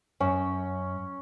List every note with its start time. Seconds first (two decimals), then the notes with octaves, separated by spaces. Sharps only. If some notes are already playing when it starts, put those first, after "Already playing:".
0.20 F#2 C#4